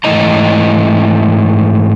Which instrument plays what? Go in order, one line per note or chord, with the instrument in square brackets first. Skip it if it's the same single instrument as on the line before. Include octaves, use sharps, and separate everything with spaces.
[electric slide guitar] G#2 E3 A3 E4 D#5 A#5